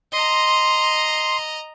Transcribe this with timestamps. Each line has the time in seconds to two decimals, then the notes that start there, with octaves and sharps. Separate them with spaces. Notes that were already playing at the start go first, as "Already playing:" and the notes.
0.13 D#5 A#5 C6